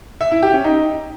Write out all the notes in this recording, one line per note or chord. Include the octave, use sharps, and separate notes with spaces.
E5
E4
G4
C#4
D#4